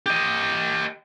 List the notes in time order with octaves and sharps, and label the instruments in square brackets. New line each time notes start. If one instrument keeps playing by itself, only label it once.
[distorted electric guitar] G4 D#5